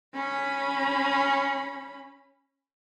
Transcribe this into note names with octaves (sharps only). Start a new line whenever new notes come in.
C#4 B5